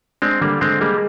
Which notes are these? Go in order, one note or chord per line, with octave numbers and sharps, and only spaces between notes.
G#3 C4 D4
D3 G3 A#3
D3 G#3 C4
G3 G#3 A#3